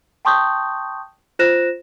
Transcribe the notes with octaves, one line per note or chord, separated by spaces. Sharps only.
G5 A5 C6 C#6 D#6 G6
F4 C5 F#6 A#6 E7